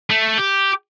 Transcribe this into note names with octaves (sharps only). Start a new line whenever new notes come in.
A3
G4